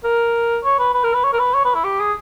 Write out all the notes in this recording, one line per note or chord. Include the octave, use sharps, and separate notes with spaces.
A#4
C#5
B4
B4
A#4
B4
C#5
A#4
B4
C#5
B4
E4
G4
G#4